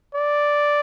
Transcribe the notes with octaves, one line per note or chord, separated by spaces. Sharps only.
D5